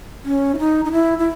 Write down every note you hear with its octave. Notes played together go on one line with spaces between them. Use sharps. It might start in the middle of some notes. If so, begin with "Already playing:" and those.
C#4
E4
D#4
D#4
E4
E4